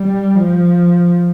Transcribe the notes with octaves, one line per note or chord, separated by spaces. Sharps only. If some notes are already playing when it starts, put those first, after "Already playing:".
Already playing: G3
F3